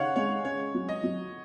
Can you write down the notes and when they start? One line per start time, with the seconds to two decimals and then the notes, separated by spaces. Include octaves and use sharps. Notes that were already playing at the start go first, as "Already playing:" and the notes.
Already playing: C#3 D#4 C#5 F5 F#5
0.16 G#3 C#5
0.45 C#4 C#5
0.75 F#3
0.89 D#5
1.03 F#3